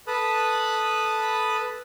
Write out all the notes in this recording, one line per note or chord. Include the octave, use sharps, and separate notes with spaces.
A4 B4 A5 B5 D#6 F#6